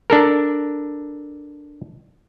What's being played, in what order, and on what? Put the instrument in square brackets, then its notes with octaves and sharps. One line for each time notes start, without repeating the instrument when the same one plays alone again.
[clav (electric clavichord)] D4 A4 A#4